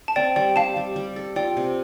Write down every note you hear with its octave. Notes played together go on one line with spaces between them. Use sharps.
A5
C4 D5 G5
G3 D5 G5
G4 F5 A5
G3
G3
A4
F4 D5 G5
C3